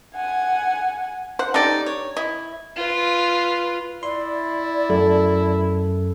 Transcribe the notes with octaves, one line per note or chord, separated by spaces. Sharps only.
F#5 G#5
C5 F#5
G3 D4 D#4 A4 D5
C#5
E4 D#5
F4 B4
E4 D5 C6
F#2 A4